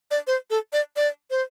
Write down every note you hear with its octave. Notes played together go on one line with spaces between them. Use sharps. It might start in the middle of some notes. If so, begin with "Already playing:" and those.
D5
C5
A4
D5
D5
C5